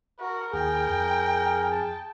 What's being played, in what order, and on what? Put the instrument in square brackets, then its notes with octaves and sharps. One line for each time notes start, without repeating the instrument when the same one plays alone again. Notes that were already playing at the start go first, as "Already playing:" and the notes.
[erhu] F#4 [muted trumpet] A#4
[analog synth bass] D#2 [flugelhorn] G#4 [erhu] G5
[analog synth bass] F2
[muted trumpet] A5